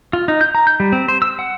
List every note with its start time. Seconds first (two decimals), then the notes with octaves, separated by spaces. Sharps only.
0.13 F4
0.28 D#4
0.41 G6
0.55 A#5
0.67 G6
0.80 G3
0.92 C4
1.08 C5
1.22 E6
1.39 F#5